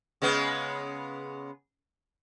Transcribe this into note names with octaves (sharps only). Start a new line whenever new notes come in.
C#3 G#3 B3